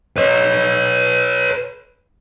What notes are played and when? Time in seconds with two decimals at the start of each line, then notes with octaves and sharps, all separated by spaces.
0.17 B4 C#5